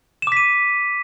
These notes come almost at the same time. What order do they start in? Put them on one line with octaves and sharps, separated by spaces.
E7 D6 B6 D#7